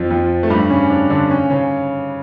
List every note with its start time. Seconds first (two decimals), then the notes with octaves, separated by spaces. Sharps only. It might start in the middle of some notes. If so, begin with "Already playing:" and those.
Already playing: F2 F3
0.10 F2 F3
0.43 A3
0.50 G2 G3
0.70 C#3 C#4
0.90 D4
1.10 D3 D4
1.30 C#3 C#4
1.50 C#3 C#4